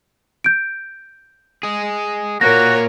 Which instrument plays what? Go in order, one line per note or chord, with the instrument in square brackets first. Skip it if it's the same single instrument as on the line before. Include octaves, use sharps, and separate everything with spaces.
[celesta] G6 D7
[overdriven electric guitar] G#4 D#5
[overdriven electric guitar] A#2 A#3 [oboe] F#4 [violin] A#4 C#5 [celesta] A#6